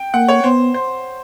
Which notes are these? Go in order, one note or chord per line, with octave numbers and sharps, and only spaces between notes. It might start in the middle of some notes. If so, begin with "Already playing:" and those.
Already playing: G5
A#3 F#5
C#5
B3 C5
C5